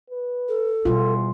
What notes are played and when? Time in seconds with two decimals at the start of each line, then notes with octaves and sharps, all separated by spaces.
0.10 B4
0.49 A4
0.85 E2 B2 G3 F4